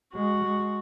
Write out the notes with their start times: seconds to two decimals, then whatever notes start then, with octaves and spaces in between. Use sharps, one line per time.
0.15 G#3 F#4
0.43 G#3